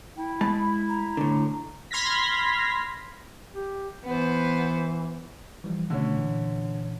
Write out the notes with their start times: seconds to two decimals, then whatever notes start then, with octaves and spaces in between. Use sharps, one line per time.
0.17 E4 G5
0.41 G#3 A5 B5
0.89 A#5
1.17 A2 D3
1.91 B5 C6 F6 G#6 A#6 B6
3.55 G4
4.04 E3 B3 C5
5.64 E3 F3 G3
5.90 B2 D3 D#3 A3 C#4
6.17 A#2 E3